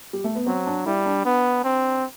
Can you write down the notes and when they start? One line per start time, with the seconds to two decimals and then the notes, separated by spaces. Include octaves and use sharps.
0.13 G3
0.24 A3
0.35 B3
0.47 F#3 C4
0.67 D4
0.86 G3 E4
1.06 D4
1.25 B3
1.64 C4